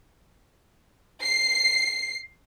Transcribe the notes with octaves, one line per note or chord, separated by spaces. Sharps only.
C7